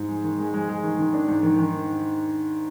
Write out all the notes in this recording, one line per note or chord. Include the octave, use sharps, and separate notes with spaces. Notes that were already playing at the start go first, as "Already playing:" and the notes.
Already playing: G#2
G#3
D#3
G#3
G#3
G#3
D#3
D#3
D4
G#2
D#3
D#3